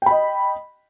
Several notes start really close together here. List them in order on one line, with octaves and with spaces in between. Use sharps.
G5 B5 D#5